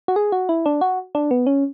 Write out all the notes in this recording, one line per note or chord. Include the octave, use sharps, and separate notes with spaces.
F#4
G#4
F#4
E4
D4
F#4
D4
B3
C#4